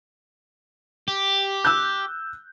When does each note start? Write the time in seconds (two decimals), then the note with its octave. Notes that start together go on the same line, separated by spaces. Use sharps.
1.08 G4
1.65 E6 F#6 G6